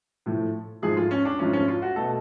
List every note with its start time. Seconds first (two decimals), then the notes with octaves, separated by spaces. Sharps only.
0.26 A2 F3 A3
0.82 G#2 F3 A3 G#4
0.97 F4
1.11 C#4
1.25 D4
1.39 G#2 F3 A3 C#4
1.53 C#4
1.68 F4
1.82 F#4
1.96 B2 A3 A4